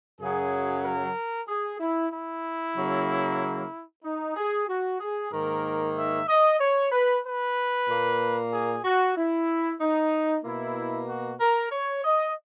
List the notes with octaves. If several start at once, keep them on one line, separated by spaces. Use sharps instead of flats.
F#2 C#3 F#3 G#4
A#4
G#4
E4
E4
C#3 F#3 A#3
D#4
G#4
F#4
G#4
G#2 D#3 A#3 A#4
E5
D#5
C#5
B4
B4
A#2 A#3
G#4
F#4
E4
D#4
B2 A#3 E4
F#4
A#4
C#5
D#5